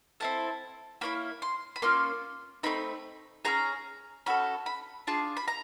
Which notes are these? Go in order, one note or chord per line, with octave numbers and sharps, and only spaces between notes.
C4 E4 A4 A5
A#3 C#4 E4 B5
C6
B5
A#3 C#4 F4 C6
A3 C4 D#4 B5
C#4 F4 G#4 A#5
C#4 F#4 A4 B5
B5
D4 F4 G#4 A5
B5
A#5